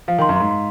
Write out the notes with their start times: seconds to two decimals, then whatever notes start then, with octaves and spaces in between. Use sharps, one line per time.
0.08 F3 F5
0.18 D#3
0.22 C6
0.29 F#2
0.36 G#2 C6
0.51 C6